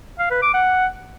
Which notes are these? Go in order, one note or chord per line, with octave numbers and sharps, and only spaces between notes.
F5
B4
D6
F#5